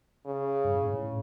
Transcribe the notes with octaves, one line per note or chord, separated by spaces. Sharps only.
C#3
G2
A2
G#2
A2